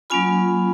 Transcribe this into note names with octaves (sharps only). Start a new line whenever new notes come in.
F#3 A#3 C#4 F4 G#5 B5